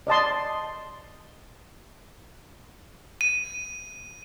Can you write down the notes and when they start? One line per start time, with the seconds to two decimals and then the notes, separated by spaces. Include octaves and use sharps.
0.07 D5 D#5 A5 C6
3.21 D#7